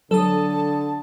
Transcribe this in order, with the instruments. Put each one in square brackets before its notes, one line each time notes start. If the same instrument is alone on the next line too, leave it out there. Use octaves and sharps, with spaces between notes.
[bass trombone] D3 [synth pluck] F#3 [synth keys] A4 D#6 [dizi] A5